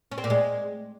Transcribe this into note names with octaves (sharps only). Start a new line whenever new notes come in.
C#4
C4
A#2
G#3